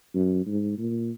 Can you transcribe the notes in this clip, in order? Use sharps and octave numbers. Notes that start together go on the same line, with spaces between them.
F#2
G#2
A#2